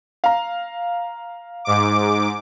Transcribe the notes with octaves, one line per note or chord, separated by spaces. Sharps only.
F5 A#5
G#2 D6